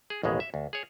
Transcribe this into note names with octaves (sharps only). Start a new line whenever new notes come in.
G#4
A1 D#2 B2 G#3
E5
D2
G#4 C#5